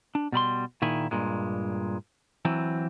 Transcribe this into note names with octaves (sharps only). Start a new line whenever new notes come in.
D4
B2 G3 B5 C6
A#2 D#3 E4 G#4
G2 A#2 G#3
E3 F#3 C4